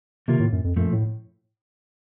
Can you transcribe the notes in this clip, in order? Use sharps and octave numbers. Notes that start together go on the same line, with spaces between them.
C3 D#3 A#3 F4 A#4
A2
F#2
F2
F#2 A#2 F3 A3
A2